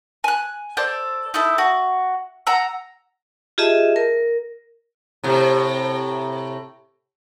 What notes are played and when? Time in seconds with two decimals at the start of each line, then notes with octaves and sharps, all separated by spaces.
0.24 G#5 F#6
0.77 A4 C5 D5
1.34 D#4 E4 A4
1.58 F#4
2.47 F#5 A#5 E6
3.58 F4 G4 G#4 D#5 E5 A5
3.96 A#4
5.23 A2 C3